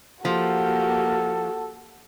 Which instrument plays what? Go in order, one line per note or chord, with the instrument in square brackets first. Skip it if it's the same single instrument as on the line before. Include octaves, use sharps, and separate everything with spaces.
[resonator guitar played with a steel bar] F3 [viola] A#3 G4 [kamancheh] F#4 [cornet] A4